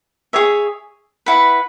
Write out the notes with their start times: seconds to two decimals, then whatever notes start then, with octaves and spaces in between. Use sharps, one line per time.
0.33 G#4 C#5 E5
1.26 E4 B4 F#5